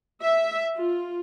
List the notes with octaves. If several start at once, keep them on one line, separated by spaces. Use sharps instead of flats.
E5
F4